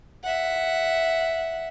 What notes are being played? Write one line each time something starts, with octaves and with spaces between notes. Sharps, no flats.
E5 F#5